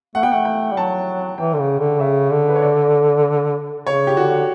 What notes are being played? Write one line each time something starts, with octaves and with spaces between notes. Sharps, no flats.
A3 F#5
B3 G5
A3 F#5
G5
G3
F#3 A5
E3 G5
D3
C#3
D3
C#3 E5
D3
B4
C#5
D5
C#3 C#5
G4
D3 F#4